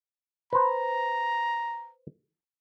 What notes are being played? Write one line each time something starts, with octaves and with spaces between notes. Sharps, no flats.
B4 C5 A#5